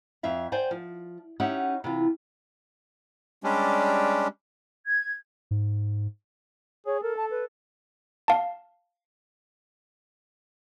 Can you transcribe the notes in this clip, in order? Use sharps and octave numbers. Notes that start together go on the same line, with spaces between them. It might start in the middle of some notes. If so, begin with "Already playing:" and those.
F2 E5 F5
C5 D5 G5 G#5
F3
C#4 D#4 G4 E5 F#5
C3 E3 F4
G3 G#3 C#4 D4 G4
G#6
G#2
G#4 C#5
A4 A#4
A5
B4
F5 A5